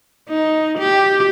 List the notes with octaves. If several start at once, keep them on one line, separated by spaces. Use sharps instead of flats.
D#4
G4